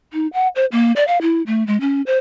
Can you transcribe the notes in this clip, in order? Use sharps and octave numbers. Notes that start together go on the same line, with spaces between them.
D#4
F#5
C5
A#3
D5
F5
E4
A3
G#3
C#4
C5